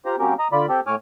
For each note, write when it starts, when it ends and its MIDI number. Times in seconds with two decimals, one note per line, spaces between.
0.05 0.16 65
0.05 0.16 67
0.05 0.16 72
0.05 0.16 82
0.19 0.34 54
0.19 0.34 58
0.19 0.34 60
0.19 0.34 61
0.19 0.34 67
0.19 0.34 70
0.39 0.48 75
0.39 0.48 82
0.52 0.66 50
0.52 0.66 65
0.52 0.66 74
0.52 0.66 83
0.69 0.80 60
0.69 0.80 67
0.69 0.80 69
0.87 0.95 45
0.87 0.95 73
0.87 0.95 80
0.87 0.95 86
0.87 0.95 89